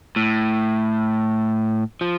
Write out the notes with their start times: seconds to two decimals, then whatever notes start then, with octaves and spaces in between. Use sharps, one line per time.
0.16 A2
2.01 F3